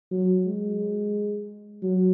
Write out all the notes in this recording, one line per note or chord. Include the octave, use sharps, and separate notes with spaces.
F#3
G#3
F#3